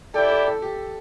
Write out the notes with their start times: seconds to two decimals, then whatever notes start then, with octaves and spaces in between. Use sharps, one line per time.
0.14 E4 G4 A4 D5 G5
0.31 A4
0.47 A4
0.62 G4